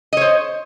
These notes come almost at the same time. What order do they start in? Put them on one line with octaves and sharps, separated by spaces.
D#5 C#5 C5